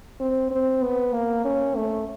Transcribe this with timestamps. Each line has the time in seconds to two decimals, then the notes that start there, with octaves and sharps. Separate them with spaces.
0.20 C4
0.51 C4
0.83 B3
1.14 A#3
1.45 C#4
1.76 A3